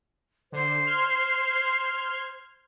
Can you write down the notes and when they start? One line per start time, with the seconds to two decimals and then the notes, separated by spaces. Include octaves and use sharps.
0.52 D3 C5
0.85 C6 F6 G#6